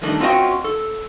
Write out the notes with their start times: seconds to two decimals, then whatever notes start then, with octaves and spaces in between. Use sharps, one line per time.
0.02 D#3 G3 A3 D4 D#4
0.20 C4 C#4 F4 F#4 D#5 G5
0.64 A4